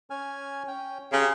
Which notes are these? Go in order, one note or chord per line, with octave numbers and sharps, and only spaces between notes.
C#4 G#5 F6
C#4 G5
C#3 G4 A#5 C6